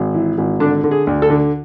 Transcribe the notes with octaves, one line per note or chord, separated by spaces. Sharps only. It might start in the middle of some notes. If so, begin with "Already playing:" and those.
Already playing: G#1
E3
G#1
D3 D4
D3
G#4
D2
A4
D3